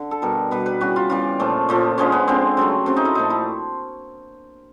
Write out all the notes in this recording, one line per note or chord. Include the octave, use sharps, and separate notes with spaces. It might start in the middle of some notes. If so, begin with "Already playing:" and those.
Already playing: D3
A4
B2 G3 A#4
B2 G3 B4
B4
C#3 E3 G3 F#4
F4
C#3 E3 G3 F4
A#2 F3 A3
A#2 F3 A3
D3 F3 G#3 C#4
B3
D3 F3 G#3 C4
C#3 F#3 A3
C#3 F#3 A3 C4
D#4
E4
A#2 F3 A3 D#4
E4